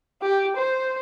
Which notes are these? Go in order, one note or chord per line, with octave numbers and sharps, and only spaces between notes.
G4
C5